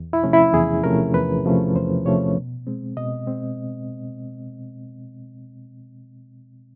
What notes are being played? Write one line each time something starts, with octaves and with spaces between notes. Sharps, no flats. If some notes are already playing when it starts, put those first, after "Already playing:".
Already playing: E2
E4
C3 F3 A3 C#4
E4
E2 G#4
C3 F3 A3 C#4 A#4
E2 B4
C3 F3 A3 C#4
E2 C5
C3 F3 A3 C#4 C#5
B2
G#3 C4
B2 D#5
G#3 C4